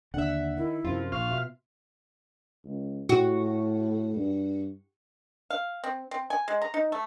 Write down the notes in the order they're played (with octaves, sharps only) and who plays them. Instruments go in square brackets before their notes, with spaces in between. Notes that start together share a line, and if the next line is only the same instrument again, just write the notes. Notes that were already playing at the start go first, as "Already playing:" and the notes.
[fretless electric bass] D#2 D3 D4 [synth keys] E5 F#5
[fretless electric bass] D#3 [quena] E4
[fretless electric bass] F#2 C3 F3 [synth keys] F4
[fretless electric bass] A#1 [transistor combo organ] F5 [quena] C#6
[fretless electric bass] B2 [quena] E5
[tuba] C#2
[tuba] A2 [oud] F#4
[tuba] G2
[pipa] F5
C4
C4
G#5
G#3
A#5
D#4
A3